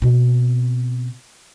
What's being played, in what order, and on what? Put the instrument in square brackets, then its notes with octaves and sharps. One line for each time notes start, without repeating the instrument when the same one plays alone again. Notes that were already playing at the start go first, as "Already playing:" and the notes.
[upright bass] B2 C4